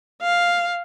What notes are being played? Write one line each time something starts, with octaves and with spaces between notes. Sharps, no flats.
F5